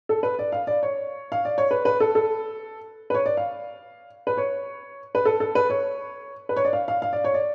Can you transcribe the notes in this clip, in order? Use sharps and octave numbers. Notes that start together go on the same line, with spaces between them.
A4
B4
D5
F5
D5
C#5
F5
D5
C#5
B4
B4
A4
A4
B4
C#5
D5
F5
B4
C#5
B4
A4
A4
B4
C#5
B4
C#5
D5
F5
F5
F5
D5
C#5
D5